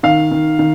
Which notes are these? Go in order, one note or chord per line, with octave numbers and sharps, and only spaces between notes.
D#3 F5
D#3
D#3